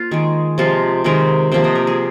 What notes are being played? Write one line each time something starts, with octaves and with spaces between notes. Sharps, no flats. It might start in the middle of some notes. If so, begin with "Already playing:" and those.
Already playing: A#3 F4 C5
D#3 G#3 G#4
C3 F3 G#3 F4
C3 D#3 G#3 A#4
C3 F3 A#3 C5
D#5
A#4
G#4